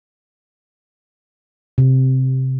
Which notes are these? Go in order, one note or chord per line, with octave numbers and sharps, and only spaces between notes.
C3